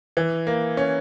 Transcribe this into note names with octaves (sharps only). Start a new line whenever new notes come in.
E3
A#3
C#4